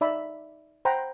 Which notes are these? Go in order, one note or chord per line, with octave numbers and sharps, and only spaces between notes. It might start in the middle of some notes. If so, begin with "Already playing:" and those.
D#4 D5 E5 B5
C5 F#5 G5 A#5 B5